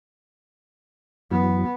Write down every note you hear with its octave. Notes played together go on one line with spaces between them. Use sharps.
F#2 E3 F#3 B3